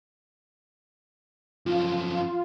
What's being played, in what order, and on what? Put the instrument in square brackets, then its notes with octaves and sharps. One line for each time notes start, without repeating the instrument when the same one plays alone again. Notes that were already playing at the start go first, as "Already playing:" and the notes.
[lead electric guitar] F#2 F3 [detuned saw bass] F4